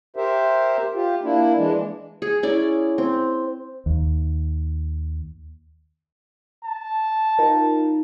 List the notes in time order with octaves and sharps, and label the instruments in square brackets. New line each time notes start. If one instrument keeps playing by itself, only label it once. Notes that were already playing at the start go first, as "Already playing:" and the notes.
[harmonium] G4 A#4 C5 E5
F4 G4
A#3 D4 E4
E3 G#3 D4
[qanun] G#4
C#4 E4 D5
C4
[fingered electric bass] D#2
[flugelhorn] A5
[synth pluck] D#4 F4 A#4